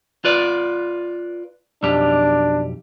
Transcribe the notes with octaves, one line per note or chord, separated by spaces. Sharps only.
F4 B4 D5
B1 F2 D4 G4